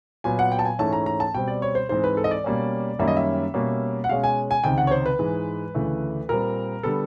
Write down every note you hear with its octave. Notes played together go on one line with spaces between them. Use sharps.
A#2 F#3 B3 G#5
F#5
G5
A5
G#5
G#2 E3 A3 C#4 A5
A#5
A#5
A5
B2 G3 C4 G5
D5
C#5
C5
G#2 E3 G#3 C4 C5
B4
A4
D#5
D5
B2 G3 A#3 C#4
F#2 D#3 G3 A#3 C#4 E5
D#5
E5
B2 G3 A#3 C#4
F#5
B2 G#3 C#4 F5
G#5
G#5
C#2 C3 D#3 G5
F#5
C#5
C5
B4
G#2 E3 G#3
D2 C#3 E3 A3
A#2 G3 C4 A#4
D3 G3 B3 A4